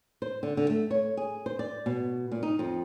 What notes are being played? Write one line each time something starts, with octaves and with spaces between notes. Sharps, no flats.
C5
D3
D3
A3
C#5
G#4
C5
D5
B2
A#2
D#4
F2